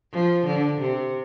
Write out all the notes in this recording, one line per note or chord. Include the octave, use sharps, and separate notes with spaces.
F3
D3
C3